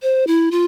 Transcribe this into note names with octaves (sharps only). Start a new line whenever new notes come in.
C5
E4
F4